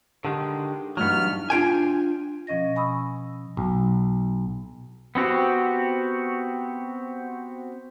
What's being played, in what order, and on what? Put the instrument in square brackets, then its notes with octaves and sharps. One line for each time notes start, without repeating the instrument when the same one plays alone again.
[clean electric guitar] D3 D#3 G#3 [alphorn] G4
[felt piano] G2 E3 [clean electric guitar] F#3 B3 [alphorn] D#4 [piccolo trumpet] F6
[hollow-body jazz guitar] D4 F4 G5 G#5
[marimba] B2 F3 C#4 D#5 A#6
G#5 B5 C#6 D#6 E6
[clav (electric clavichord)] B1
[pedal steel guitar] B3 C4 F#4 G4